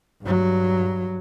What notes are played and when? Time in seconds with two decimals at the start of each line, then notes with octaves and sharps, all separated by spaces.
0.22 G2 F#3